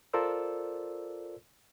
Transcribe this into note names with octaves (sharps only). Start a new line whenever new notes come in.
F4 A4 A#4 C5 D5 E6